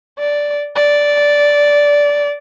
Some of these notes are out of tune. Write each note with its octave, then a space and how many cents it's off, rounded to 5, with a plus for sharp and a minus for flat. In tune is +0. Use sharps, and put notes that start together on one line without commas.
D5 -5
D5 -10